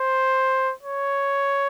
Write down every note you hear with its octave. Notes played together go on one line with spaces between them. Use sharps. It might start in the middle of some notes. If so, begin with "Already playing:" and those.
Already playing: C5
C#5